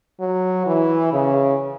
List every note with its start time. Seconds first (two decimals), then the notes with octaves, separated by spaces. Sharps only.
0.20 F#3
0.66 E3
1.13 C#3